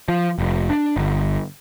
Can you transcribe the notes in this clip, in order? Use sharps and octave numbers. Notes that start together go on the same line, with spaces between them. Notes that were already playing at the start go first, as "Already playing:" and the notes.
F3
F1
D4
G1